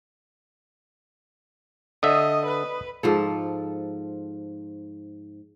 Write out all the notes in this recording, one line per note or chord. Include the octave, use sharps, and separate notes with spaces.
D3 D#5 E5 D#6
B4
G#2 F3 A4